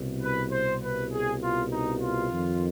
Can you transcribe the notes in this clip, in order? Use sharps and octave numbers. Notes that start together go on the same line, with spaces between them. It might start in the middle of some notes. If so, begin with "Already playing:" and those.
Already playing: C2 B2
B4
C5
B4
G#4
F4
D#4
F4
F2 D#3